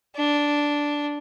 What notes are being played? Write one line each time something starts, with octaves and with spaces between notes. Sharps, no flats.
D4